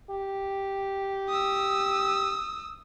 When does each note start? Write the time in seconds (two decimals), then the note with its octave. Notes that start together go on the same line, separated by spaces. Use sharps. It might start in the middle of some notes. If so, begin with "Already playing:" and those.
0.11 G4
1.29 D#6 E6